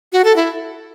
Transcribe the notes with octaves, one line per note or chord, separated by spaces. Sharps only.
F#4
A4
E4